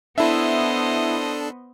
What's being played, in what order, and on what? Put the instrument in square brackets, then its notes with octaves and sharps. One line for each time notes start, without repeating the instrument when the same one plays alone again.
[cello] B3 [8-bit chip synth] D4 A4 [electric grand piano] E4 E5 [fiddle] C5 D#5